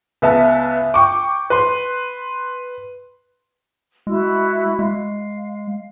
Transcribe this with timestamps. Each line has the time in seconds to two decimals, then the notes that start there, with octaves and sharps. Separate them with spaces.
0.22 C#2 B3 E5 A5
0.94 G5 C#6 D6
1.50 B4 C6
4.07 G#3 E4 F#4 E6
4.79 G#3 F5